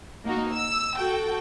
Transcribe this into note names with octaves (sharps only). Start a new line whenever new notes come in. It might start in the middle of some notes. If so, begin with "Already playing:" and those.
A#3 D#4 F#4
E6
F#4 A4 G5